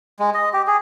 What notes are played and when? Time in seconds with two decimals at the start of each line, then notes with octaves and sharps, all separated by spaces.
0.19 G#3
0.34 D#5
0.53 G4
0.67 G#4